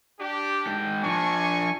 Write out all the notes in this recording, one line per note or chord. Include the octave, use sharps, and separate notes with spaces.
D4 G4
G#2 G5
F3 D4 G#5 C#6